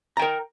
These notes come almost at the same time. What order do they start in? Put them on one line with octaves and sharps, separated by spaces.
A#5 G5 A#4